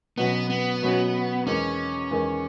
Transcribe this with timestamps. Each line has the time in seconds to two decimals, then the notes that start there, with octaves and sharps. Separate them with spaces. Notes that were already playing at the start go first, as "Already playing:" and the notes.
0.18 B2 F#3 B3 C#4 F#4
0.50 B3
0.82 B2 F#3 C#4 F#4
1.46 E2 D#3 G#3 C#4
2.11 E2 D#3 G#3